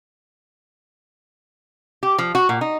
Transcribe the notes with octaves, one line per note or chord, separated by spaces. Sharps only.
G4
F3
F#4
A#2
D#4